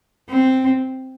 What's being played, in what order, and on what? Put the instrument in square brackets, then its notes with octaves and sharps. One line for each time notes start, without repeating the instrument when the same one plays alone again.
[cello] C4